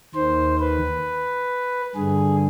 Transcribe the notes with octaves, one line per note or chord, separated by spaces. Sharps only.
D#2 D#3 C5
B4
G2 D3 G#4